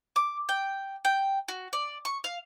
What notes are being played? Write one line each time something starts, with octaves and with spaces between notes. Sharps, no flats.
D6
G5
G5
F#4
D5
C#6
F5